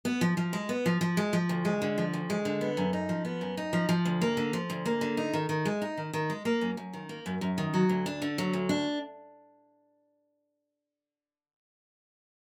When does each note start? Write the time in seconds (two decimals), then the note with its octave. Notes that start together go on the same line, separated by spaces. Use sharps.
0.05 B3
0.21 F3
0.37 F3
0.53 G#3
0.69 B3
0.86 F3
1.01 F3
1.17 G#3
1.33 F3
1.49 D2
1.65 G#3
1.82 D3
1.98 F3
2.14 D2
2.30 G#3
2.45 D3
2.61 B3
2.77 F#2
2.93 D#4
3.09 F3
3.25 B3
3.41 F#2
3.57 D#4
3.73 F3
3.89 F3
4.05 D2
4.22 A#3
4.37 D3
4.53 F3
4.70 D2
4.86 A#3
5.01 D3
5.17 D#4
5.33 D#3
5.49 D#3
5.65 G#3
5.82 D#4
5.98 D#3
6.13 D#3
6.30 G#3
6.45 A#3
6.61 F#2
6.77 F#2
6.94 D#3
7.09 A#3
7.26 F#2
7.41 F#2
7.58 D#3
7.74 F#3
7.89 D2
8.06 D4
8.22 D3
8.38 F#3
8.53 D2
8.69 D4